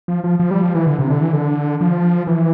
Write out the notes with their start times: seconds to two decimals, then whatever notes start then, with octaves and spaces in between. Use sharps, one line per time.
0.08 F3
0.24 F3
0.40 F3
0.51 G3
0.62 F3
0.75 E3
0.87 D3
0.99 C3
1.10 D3
1.21 E3
1.33 D3
1.81 F3
2.27 E3